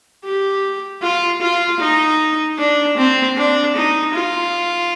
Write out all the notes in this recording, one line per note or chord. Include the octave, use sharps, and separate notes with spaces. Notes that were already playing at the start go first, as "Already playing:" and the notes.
G4
F4
F4
D#4
D4
C4
D4
D#4
F4